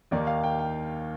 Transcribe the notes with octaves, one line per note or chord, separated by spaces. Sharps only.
D#2 D#3 A#3 D5
F5
G5
G5